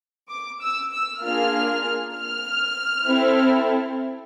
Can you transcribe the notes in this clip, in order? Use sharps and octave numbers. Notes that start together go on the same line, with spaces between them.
D6
E6
E6
A#3 D4 F4 G#4 F6
F6
C4 E4 A4